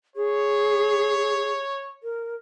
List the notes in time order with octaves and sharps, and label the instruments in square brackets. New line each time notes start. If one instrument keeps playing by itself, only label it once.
[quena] G#4 [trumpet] C#5
[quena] A#4